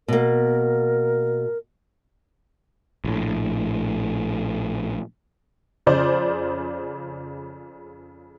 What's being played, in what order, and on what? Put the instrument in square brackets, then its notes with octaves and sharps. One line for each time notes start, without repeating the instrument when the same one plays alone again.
[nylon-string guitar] B2 A#3 [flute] A#4
[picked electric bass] A#1 A2
[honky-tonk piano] F2 C#3 C5 D5